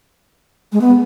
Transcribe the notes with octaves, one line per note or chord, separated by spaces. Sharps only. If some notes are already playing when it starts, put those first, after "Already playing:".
G#3
B3